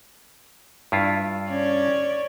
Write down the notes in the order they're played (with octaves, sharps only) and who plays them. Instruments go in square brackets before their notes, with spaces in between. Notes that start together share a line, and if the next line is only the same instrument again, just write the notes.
[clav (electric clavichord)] G2 E4 F4
[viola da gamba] C#4 C#5 D5